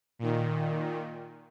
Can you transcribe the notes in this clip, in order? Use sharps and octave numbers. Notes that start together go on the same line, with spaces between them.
A#2 D#3